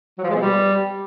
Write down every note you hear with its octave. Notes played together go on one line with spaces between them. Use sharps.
F#3
F3
G#3
B2
G3